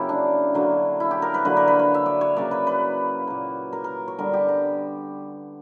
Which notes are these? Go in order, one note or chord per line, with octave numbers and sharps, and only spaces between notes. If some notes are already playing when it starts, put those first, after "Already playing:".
Already playing: C#3 F#3 A#3 E4 G4 A#4
D4
D3 F#3 A#3
E4
G4
A#4
B4
D3 F#3 A#3 B4
A#4
B4
C#5
E5
D5
C#5
C#3 F#3 A#3 D5
B4
B4
A#2 A#3
A#4
A#4
C#5
D3 G3 B3 A#4
G4
A#4